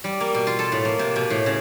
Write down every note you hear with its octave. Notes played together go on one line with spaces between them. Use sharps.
G3
A#3
B2
F4
A4
A2
A#3
C3
B2
A2
C#3